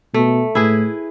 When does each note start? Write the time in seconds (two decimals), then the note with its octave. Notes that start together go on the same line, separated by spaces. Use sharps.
0.14 B2 A3
0.55 A2 E4 G#4 B4